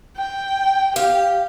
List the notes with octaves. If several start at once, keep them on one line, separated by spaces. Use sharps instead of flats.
G5
G4 F5